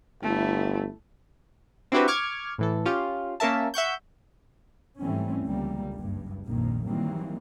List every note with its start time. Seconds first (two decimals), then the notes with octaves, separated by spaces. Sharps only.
0.23 G1 A3 E4
1.92 C4 D4 E4 F#4 G4 B4
2.08 C#6 D6 F6 G#6
2.58 A2 E3 A4
2.85 C#4 F4 G4
3.40 A#3 C#4 A#4 E5 A5
3.74 E5 F#5 C#6 G6
5.00 G#2 E3 G3 A3 C4 C#4
5.43 C#2 D3 G3 A#3
5.93 F#1 G2
6.45 A#1 F2 D#3 F3 A#3
6.84 D#3 E3 F#3 G3 A#3 C4